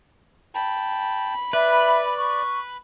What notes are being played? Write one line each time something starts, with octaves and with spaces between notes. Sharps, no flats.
G5 A5 B5
B4 D5 E5
C#6